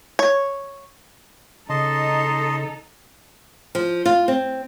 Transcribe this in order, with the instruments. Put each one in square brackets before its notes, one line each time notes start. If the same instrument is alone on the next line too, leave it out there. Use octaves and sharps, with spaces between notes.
[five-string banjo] C#5
[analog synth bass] C#3 [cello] D#4 A4 [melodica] D#5 A5 C6
[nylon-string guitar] F3
F4
C4